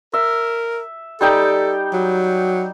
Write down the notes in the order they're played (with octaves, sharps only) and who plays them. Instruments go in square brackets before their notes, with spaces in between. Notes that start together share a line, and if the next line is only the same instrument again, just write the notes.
[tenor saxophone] A#4 [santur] E5
[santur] G3 D#4 G5 [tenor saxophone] A4
[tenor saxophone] F#3